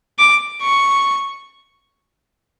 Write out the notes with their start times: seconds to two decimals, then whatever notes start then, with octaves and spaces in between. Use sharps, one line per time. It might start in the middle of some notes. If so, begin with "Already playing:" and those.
0.19 D6
0.62 C#6